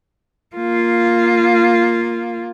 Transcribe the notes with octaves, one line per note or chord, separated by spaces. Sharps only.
A#3 F4